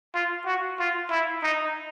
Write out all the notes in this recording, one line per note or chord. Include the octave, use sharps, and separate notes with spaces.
F4
F#4
F4
E4
D#4